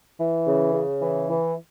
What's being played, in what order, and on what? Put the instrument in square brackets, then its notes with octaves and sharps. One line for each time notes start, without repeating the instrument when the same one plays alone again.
[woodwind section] E3
C#3
C#3
E3
E3